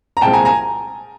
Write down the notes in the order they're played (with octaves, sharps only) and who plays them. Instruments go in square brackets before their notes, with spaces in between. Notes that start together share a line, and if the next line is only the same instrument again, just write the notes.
[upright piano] A#5
C2 A#2 F3 G#3 C4 G5 A5
G#5 A#5
G#5 A#5